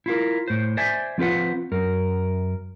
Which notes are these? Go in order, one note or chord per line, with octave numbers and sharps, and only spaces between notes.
E4 F4 A#4
A2 C5
C5 D5 E5 G#5
F3 C4 F4 B4 F#5
F#2 A#4